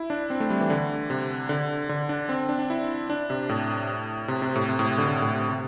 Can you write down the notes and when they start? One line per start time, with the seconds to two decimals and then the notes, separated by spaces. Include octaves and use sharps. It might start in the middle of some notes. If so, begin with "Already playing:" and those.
Already playing: E4
0.10 D4
0.30 C4
0.40 A3
0.50 G3
0.61 E3
0.70 D3
1.10 C3
1.49 D3
1.89 D3
2.09 D4
2.29 C4
2.49 D4
2.59 D4
2.70 E4
3.10 D4
3.30 C3
3.49 A2
4.28 C3
4.42 C3
4.56 A2
4.69 C3
4.79 A2
4.88 C3
4.98 D3
5.09 D3
5.22 A2
5.35 C3
5.49 C3